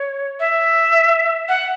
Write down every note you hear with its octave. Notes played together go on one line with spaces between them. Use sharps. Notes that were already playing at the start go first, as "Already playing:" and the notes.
Already playing: C#5
E5
F#5